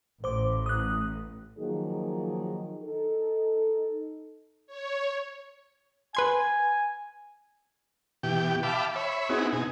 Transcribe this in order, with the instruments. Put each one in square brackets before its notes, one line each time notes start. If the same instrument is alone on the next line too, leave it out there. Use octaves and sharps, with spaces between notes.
[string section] A1 A2 [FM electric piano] C5 D6
[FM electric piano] D#6 F#6
[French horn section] D#3 F3 F#3 A#3 D#4 G#4
D#4 A4
[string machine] C#5
[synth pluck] B4 C6 G#6 [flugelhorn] G#5
[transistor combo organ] B2 E3 G4 G5
E5 F5 G5 A5 B5 D6
C#5 E5 B5
B3 C4 D#4 E4 F#4 G#4
B2 D#4 G#5